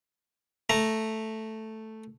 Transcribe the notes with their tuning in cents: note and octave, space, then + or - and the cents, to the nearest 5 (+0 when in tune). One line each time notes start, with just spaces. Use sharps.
A3 +0 A#5 +0